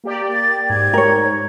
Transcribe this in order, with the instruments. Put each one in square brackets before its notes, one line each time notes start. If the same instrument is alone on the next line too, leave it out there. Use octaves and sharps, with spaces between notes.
[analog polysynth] A#3 G4 D5
[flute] A6
[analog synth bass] G#2 [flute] G#6
[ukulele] A#4 C#5